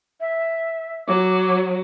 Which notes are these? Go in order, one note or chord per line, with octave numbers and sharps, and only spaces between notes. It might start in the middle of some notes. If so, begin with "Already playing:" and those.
E5
F#3 D6